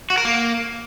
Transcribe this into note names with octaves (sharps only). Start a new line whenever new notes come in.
F#4
A#4
A#3